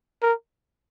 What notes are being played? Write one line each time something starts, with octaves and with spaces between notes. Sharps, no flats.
A#4